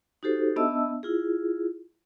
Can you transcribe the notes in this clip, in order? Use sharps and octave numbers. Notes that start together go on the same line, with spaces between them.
D#4 F#4 G4 A4 C5
B3 D4 D#5 E5 A5 E6
E4 F4 G#4